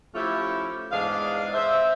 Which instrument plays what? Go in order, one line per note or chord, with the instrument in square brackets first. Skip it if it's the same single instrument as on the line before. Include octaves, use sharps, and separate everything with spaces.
[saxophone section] F3 A3 C#4 E4 F4 G4
E2 G#2 D4 G#4 F5
C5 E5